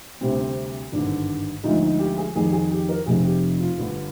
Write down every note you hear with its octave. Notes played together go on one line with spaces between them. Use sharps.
D2 C3 G3 C4
C4
G#1 G2 D3 D4
D2 D3 F3 G#3 D#4
D#4
G4
G#4
F2 D#3 G3 G#4
G#4
G4
A#4
F1 F2 C3 G#4
G4
F4
G1 G2 D3